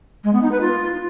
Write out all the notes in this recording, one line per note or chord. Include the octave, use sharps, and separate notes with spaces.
G#3
B3
D#4
B4
F4